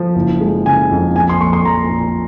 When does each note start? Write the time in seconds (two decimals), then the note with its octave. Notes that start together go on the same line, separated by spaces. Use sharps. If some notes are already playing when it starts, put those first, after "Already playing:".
Already playing: F3
0.16 F#1
0.41 G#3
0.66 C#3 G#5
0.91 F2
1.15 A#1 G#5
1.29 C6
1.40 A#1 C#6
1.53 C6
1.65 F3 A#5
1.90 A#2